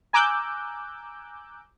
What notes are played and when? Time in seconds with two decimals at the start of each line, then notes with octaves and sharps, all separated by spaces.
0.13 G#5 A#5 D6 E6 F#6 G6